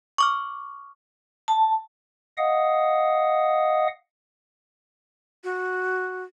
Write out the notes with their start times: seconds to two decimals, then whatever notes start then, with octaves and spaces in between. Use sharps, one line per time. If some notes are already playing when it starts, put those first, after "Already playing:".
0.18 C#6 D6 F6
1.48 A5
2.38 D#5 F5 F#5 D#6
5.44 F#4